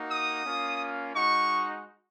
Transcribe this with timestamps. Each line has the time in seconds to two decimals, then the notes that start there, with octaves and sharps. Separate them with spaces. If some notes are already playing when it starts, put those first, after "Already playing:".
Already playing: A#3 D#4 F#4
0.11 D#6
0.45 A#3 C#4 F4
1.14 G#3 D#4 F#4 C#6